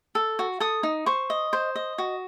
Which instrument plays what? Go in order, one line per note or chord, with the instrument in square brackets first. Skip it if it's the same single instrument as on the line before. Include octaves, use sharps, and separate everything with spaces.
[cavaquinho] A4
F#4
A4 D#6
D#4
C5 C#6
D#5
C5
D#5
F#4